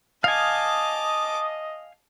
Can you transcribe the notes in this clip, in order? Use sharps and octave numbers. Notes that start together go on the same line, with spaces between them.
D#5 F5 G#5 A5 D6 D#6